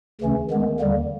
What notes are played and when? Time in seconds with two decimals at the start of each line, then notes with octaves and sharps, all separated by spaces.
0.21 D2 C#3 E3 A3 C#4
0.50 D#3 G#3 B3
0.79 D#2 D3 G3 A#3